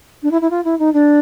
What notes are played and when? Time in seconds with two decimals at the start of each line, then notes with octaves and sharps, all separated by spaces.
0.23 D4
0.31 E4
0.41 E4
0.50 F4
0.64 E4
0.79 D#4
0.93 D4